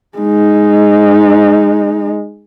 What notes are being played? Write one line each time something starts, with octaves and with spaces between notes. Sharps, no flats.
G#3 D#4